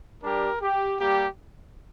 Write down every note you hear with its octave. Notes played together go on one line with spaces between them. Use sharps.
G3 D4 G4 A#4
G4
G3 A#3 G4